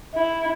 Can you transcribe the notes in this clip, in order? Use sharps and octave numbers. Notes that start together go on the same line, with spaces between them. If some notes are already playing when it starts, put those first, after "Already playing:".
E4